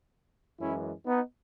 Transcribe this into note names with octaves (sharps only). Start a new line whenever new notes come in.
F#2 E3 G#3 C#4 E4
B3 D#4